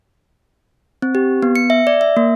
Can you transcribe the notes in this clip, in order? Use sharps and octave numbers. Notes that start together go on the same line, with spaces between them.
C4
G4
B3
C#7
E5
D5
E5
A#3